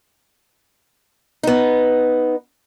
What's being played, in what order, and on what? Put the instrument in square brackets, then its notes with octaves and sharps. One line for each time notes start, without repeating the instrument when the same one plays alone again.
[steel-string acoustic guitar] B3 D#4